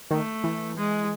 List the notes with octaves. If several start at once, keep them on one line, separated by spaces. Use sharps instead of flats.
D#3 A3
E3
G#3